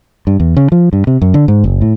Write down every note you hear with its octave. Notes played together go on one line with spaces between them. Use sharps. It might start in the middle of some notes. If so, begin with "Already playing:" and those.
G2
E2
C#3
F3
G2
C3
F#2
D3
G#2
F#1
A2